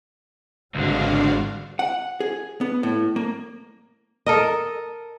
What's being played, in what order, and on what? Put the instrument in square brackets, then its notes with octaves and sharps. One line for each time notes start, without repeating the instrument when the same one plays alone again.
[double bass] G#1 G3 [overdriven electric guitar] C#2 D3 [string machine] D4 F#4 F5
[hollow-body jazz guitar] F#5
G#4
B3
A2
A#3
[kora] A4 A#4 D#5